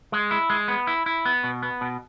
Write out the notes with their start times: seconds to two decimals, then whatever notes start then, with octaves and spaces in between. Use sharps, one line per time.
0.12 G#3
0.31 E4
0.50 G#3
0.68 B3
0.87 E4
1.06 E4
1.25 B3
1.44 B2
1.63 B3
1.81 B2